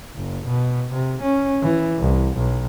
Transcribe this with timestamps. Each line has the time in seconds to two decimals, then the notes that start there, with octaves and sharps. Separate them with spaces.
0.15 F#1
0.46 B2
0.93 C3
1.22 C#4
1.63 E3
1.99 C2
2.37 B1